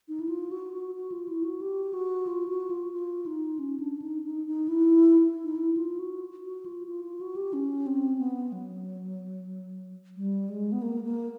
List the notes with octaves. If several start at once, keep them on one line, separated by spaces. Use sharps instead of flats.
D#4
E4
F4
F#4
F#4
F#4
F4
E4
F#4
G4
F#4
F4
F#4
F4
F4
D#4
C#4
D4
D#4
D#4
D#4
E4
D#4
E4
F4
F#4
F#4
F4
F4
F4
F#4
G4
C#4
C4
B3
F#3
G3
G#3
B3
A#3
A#3